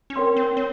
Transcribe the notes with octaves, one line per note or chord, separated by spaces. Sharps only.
C#4
C4 A#4 C#5 G5 C6
C4
C4 C#5